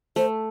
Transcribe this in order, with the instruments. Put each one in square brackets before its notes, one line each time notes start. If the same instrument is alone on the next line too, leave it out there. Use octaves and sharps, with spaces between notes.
[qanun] A3 [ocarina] C5